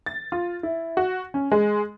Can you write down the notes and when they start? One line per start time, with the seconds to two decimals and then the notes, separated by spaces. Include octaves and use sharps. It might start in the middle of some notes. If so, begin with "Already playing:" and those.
0.06 A6
0.32 F4
0.63 E4
0.97 F#4
1.34 C#4
1.52 G#3